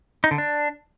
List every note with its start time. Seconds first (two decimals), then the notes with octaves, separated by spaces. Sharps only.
0.24 D#4
0.31 D3
0.38 D4